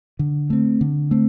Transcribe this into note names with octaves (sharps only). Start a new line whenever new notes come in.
D3
A3 C4
D3
A3 C4